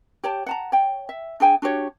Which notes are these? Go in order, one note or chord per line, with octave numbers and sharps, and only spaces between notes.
G4 C#5 G5 A5
F#5 A5 A#5
C#5 G5
E5
D4 G#4 G5 G#5
D4 F#4 G4 C#5